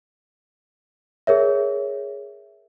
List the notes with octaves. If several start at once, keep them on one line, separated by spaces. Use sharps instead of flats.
G#4 A#4 C#5 E5